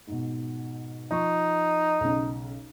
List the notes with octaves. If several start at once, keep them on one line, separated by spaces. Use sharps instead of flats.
G#2 B2
F3 D#4 C#6
B1 C#3